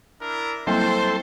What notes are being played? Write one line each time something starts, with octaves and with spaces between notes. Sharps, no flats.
D4 E4 A#4
F#3 G3 A#3 A4 C5 C6